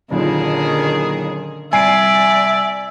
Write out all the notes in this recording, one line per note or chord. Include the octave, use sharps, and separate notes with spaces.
F#1 D#2 A#2 D3 D#3 G#4
C2 D5 E5 G#5 C7 D7